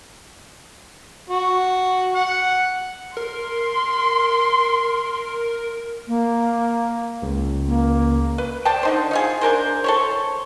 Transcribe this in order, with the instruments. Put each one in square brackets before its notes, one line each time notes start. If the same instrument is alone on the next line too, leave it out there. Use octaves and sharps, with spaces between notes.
[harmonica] F#4
F#5
[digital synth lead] A#4 [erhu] C6
[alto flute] A#3
[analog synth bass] C#2
[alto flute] A#3
[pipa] B4
C5 D5 G5 A5
D3 D#4 C5
D#4 F4 G#4
D4 G#4 A#4 C5
A4 C5 C#5